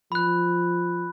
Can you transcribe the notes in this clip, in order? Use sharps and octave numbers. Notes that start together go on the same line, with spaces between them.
F3 B5 F#6